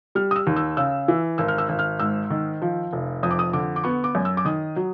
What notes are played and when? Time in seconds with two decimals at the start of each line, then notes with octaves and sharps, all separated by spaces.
0.15 G3 F6
0.31 D#6
0.36 E6
0.47 D#2
0.56 E6
0.77 C#3 E6
1.08 E3
1.38 G#1 E6
1.48 F6
1.58 E6
1.69 G#1
1.79 F6
1.99 G#2 E6
2.30 D#3
2.62 F3
2.93 F1
3.23 F2 D#6
3.31 D6
3.39 D#6
3.53 D3 D6
3.76 D6
3.84 B3 C#6
4.04 D6
4.15 F#2
4.25 E6
4.37 D6
4.45 D#3 D#6
4.76 F#3